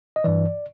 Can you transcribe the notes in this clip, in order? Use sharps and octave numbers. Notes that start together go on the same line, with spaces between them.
D#5
G2 E3 D5